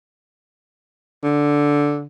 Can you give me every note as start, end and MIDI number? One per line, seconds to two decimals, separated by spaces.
1.24 2.06 50